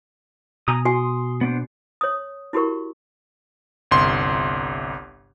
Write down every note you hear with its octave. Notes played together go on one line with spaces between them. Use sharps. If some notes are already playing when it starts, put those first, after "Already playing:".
B2 G#5 A#5 D#6
F#4 G#5 C6 D#6
B3 D4 C5
C#5 D#6
E4 F#4 G4 A#4 C#6
G1 C2 C6